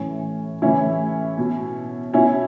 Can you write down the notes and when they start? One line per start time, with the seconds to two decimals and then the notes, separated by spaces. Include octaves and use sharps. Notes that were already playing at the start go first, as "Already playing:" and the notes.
Already playing: A2 E3 C#4
0.62 A2 E3 C#4 E4
1.38 B2
2.13 B2 C#4 E4